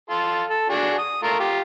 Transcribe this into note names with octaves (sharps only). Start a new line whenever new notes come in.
F4 A4 C6
A4
D4 F#4 G#4
D#6
A3 F4 A#4
F4 G4